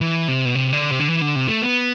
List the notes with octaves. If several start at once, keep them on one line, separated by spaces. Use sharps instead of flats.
E3
C3
B2
C3
D3
C3
D3
E3
D3
C3
A3
B3